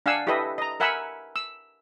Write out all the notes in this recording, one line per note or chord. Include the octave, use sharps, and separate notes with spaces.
D4 F5 F#5 G#5 E6
E4 G4 A4 B4 D#5 E5
D#5 A#5
A#4 E5 F#5 G#5 B5 E6
E6